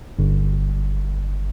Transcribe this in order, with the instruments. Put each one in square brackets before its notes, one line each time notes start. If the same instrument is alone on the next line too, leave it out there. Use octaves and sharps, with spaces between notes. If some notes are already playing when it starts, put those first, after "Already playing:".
[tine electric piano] G1